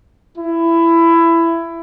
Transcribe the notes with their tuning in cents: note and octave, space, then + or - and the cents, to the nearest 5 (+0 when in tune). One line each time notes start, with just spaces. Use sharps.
E4 +15